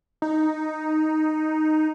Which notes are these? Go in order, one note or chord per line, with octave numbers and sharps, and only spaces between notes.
D#4